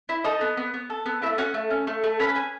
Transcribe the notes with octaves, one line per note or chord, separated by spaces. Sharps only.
E4
D#4 A4 D#5
B3
B3
B3
A4
B3
A3 E4 E5
C#4 F#4 F#5
A3
C#4
A3
A3
C#4 B4 B5
G#4